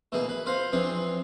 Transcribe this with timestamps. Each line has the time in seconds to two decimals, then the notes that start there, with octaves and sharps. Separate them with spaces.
0.12 B2 E3 A#3 D#4 G#4
0.29 B4
0.46 F4 B4 C5 F5 A#5
0.72 E3 F3 C4 D4 G#4